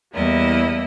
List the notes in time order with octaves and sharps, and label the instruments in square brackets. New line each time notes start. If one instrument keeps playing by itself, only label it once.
[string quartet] E2 G3 A#3 E4 D#5